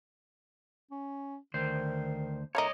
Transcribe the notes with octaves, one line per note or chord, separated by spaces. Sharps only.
C#4
D2 D#3 C5
A3 A#3 D#4 C#5 D#5